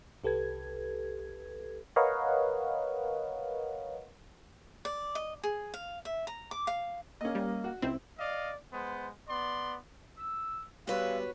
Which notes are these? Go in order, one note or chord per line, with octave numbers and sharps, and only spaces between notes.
C2 G4 A4 B4 G#6
A#4 B4 C#5 D#5 F5 F#5
D5
D#5
G#4
F5
E5
A#5
D6
F5
A#3 C#4 D#5
G3
F#4
C#2 C4 E4
D5 D#5 F5
G#3 B3 C5
B3 D5 C6
E6
G3 G#3 B3 F#4 B4 C#5 F5 E6